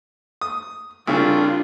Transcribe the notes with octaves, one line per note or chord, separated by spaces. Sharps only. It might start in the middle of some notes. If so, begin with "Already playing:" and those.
D#6
C2 C#3 D4 F4